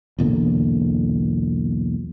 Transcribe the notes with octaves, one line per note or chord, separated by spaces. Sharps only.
B1 E2 A#2 D3